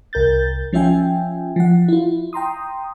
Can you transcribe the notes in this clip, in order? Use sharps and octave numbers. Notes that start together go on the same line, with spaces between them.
C2 A#4 G6 A6
F3 C#4 F4 E5 G5 G#5
F3 F#5
E4 F4
G5 A#5 C6 D#6